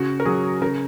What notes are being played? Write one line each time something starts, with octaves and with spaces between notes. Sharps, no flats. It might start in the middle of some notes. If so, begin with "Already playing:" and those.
Already playing: C#3 F#4
A#4
F#3 G#4
C#3 A#4